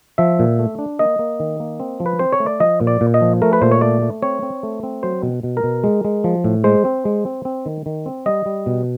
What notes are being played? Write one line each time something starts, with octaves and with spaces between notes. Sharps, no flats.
F3 E5
A#2
A3
D4
A#3 D#5
A#3
D#3
A#3
C4
F3
B4
C4 C5
C#5
A3
D5
F3 D#5
A#2
D5
A#2
D#5
F3
A3 A#4
B4
A#2 C5
C#5
A3 D5
A3
C4 C#5
C4
A3
C4
F#3 C5
B2
B2
A#4
B2
G#3
G#3
F3
A2
G#3 C5
C4
G#3
C4
C4
D#3
D#3
C4
G3 D#5
G3
B2